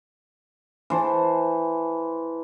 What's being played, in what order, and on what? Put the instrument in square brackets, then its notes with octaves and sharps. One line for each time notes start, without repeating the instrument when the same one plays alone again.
[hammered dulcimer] E3 C5 A5